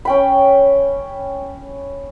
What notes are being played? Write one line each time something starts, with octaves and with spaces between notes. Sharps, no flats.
C#4 G5 B5